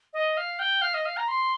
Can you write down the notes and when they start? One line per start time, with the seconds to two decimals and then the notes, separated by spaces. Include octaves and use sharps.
0.13 D#5
0.37 F5
0.59 G5
0.82 F5
0.94 D#5
1.06 F5
1.17 A#5
1.28 C6